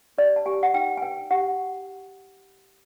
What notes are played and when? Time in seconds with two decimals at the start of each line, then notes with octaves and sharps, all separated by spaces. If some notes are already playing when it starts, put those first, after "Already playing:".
0.18 G4 D5
0.36 A5
0.46 G4 G#5
0.63 F#5
0.74 D#4 G5
0.97 G#5
1.02 B4 G5
1.31 G4 F#5